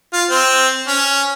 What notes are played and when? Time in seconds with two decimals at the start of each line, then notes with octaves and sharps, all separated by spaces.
0.13 F4
0.30 C4
0.88 C#4